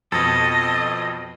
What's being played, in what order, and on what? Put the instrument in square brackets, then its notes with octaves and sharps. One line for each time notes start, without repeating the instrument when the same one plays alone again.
[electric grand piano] F2 B2 [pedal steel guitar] A4 [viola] D#5